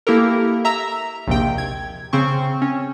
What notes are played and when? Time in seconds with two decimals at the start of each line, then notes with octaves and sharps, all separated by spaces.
0.07 A#3 E4 G4 A4 A#4
0.65 E5 A#5 E6
1.27 A#1 D#2 C3 G5
1.58 G#6
2.13 C#3 C4 C#6
2.62 C#4